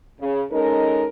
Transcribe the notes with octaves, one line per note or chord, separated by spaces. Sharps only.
C#3
G#3 C#4 D#4 A4 A#4